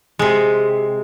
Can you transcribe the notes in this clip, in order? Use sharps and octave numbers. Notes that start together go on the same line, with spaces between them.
C3 G#3